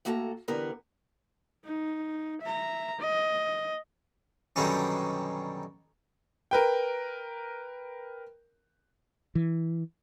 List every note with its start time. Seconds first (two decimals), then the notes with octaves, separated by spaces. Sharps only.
0.05 A2 A#3 F#4 A4 G#5 A#5
0.48 D3 E3 G3 B3 A#4 B4
1.64 D#4
2.42 E5 A#5
2.99 D#5
4.56 F#2 B2 D3 D#3 G3 C#4
6.51 A#4 B4 G5
9.35 E3